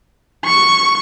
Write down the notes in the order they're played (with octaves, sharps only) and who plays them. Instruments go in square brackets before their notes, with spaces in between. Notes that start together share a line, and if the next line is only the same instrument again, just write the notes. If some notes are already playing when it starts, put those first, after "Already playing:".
[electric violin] C#6